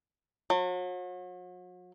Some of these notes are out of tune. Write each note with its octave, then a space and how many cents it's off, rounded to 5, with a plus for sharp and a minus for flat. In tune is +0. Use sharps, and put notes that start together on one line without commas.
F#3 -40